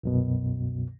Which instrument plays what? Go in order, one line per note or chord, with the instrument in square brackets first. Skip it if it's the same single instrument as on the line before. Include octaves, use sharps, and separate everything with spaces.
[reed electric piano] C2 F#2 B2